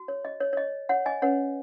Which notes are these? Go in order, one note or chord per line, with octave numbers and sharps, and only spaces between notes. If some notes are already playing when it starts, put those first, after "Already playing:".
Already playing: F#4
C#5
D#5
C#5
C#5
D#5
C#5 F#5
D#5 G#5
C#4 B4 C#5 F#5